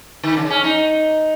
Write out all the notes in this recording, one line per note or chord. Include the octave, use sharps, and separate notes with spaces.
D#3
C#3
C#4
D#4